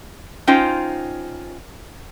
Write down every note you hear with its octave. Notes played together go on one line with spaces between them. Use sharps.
C#4 D#4 F4 C5 G5